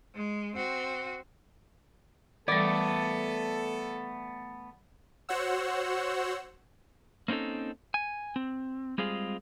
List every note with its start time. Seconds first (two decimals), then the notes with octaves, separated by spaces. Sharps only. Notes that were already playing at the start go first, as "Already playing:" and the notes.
0.16 G#3
0.56 C4 F#4
2.48 E3 G3 A3 B3 A4 D5
5.29 F#4 C5 C#5 F#5 E6
7.28 A#3 C4 C#4 D#4 A4
7.94 G#5
8.36 C4
8.98 G3 G#3 C4 F4 G#4